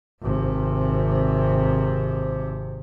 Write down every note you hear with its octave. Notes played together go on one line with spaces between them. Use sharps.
G#1 C3